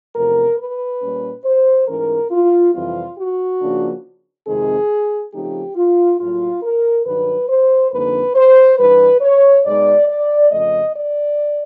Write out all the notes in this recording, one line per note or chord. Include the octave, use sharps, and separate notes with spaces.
E2 C3 F3 A3 A#4
B4
A#2 G3 A#3 C#4
C5
G#2 E3 A3 C#4 A#4
F4
F2 C3 E3 G3 C4 F4
F#4
C#3 F3 A#3 D4
F2 C3 D#3 G#3 C4 G#4
C#3 F3 A3 C4 D#4 G4
F4
A2 F#3 A#3 F4
A#4
G2 D#3 F#3 B4
C5
F2 D3 G3 A#3 D#4 B4
C5
G2 E3 G3 B4
C#5
B2 G#3 B3 D#4 D5
D5
F2 C#3 F3 A3 D#5
D5